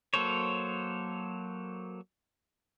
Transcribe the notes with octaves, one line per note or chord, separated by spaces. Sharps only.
F#3 A#3 A4 C5 C#5